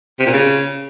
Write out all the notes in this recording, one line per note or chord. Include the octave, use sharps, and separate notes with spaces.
C3
A#2
C#3